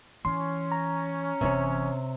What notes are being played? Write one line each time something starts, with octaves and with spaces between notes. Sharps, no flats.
E3 C#4 C6
A#5
F#1 C3 E3 C#5